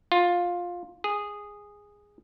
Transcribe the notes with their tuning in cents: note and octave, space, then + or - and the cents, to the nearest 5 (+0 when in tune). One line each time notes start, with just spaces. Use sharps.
F4 +10
G#4 -10